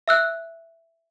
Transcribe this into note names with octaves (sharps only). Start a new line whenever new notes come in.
E5 E6 F#6